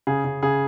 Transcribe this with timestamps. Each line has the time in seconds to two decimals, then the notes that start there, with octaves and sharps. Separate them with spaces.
0.07 C#3 G#4
0.24 C#3
0.42 C#3 G#4